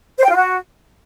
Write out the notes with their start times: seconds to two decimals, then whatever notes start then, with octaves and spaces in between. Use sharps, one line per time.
0.18 C5
0.24 G5
0.30 F4
0.36 F#4